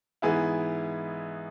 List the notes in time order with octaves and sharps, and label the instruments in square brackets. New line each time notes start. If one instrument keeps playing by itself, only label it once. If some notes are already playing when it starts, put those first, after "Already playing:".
[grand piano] G#2 E3 B3 E4 G#4